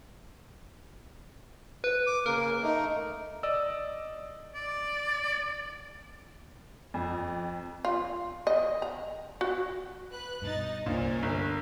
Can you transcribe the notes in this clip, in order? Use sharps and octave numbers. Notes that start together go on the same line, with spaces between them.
B4
D6
C#3 A#3 A#4
A3 D#4
D5 D#5 E6
D5
F2
F4
D#5
A#5
F#4
B4 F#6
G2 B2 D#4 D#5 A6
C2 G2 A#2 C#4 A#4 C5
G1